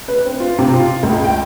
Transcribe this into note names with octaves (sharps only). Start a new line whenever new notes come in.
B4
C4
F4
C3
F4
C#2
G5